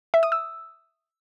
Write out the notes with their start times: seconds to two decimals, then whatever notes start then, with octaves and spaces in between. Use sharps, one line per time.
0.14 E5
0.23 D#6
0.32 E6